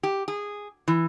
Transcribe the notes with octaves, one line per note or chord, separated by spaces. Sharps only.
G4
G#4
E3